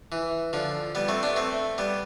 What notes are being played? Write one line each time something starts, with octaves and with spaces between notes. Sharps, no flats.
E3
D3 F3
G3 B3
A3 C4
B3 D4
A3 C4
G3 B3